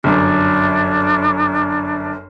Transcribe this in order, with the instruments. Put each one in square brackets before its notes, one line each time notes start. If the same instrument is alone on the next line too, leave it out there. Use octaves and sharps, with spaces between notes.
[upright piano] G1 F#2 [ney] D4